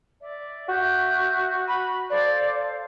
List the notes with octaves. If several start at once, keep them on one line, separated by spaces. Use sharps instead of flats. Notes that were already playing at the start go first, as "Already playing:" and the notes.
D5 E5
F#4 G4 E5 G6
B5
A4 C5 D5 F5